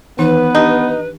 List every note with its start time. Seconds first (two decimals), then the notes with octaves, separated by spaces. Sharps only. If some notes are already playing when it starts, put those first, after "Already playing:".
0.19 D#3 E3 B3 D#4 B4
0.55 D4 D#4 G4 A5